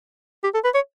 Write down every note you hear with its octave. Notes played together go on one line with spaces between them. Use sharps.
G4
A4
B4
C#5